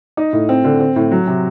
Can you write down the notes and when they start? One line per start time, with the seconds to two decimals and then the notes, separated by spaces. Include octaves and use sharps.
0.17 D#4
0.33 A2
0.49 C4
0.64 D3
0.80 C4
0.96 A2
1.12 F#3
1.27 C3